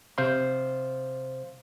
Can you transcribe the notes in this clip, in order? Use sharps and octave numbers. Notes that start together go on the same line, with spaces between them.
C3 C5 F5 C6